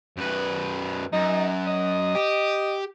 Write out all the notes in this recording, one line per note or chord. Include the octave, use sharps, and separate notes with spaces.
F#2 B4
F#2 D#4
D#5
G4